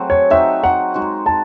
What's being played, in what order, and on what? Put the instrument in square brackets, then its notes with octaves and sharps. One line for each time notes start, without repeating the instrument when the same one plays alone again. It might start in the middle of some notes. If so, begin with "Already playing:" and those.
Already playing: [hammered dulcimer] F#3 A3 C4 F#4 G#4
[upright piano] C#5
[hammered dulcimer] F#3 C4 D#4 F#4 [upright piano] E5
[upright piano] F#5
[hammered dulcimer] G#3 D#4 F#4
[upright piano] A5